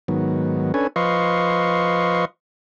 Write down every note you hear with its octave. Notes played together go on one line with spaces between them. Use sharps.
G#2 D#3 F#3 B3
C#4 D4 A4 B4 C#5 G#5
F3 B4 D#5 F5 C6 C#6